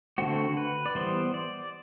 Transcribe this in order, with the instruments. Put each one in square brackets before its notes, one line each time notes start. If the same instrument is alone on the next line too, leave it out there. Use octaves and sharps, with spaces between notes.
[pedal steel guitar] D3 A3 C4 F#4
B4
D5
E3 G3 B3 C5
D5